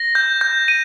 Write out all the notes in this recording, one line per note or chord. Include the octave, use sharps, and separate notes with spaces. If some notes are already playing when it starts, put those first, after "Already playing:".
Already playing: A#6
G6
G6
D#7